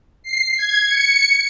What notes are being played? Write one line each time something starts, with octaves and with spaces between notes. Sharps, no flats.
C7
G#6
C#7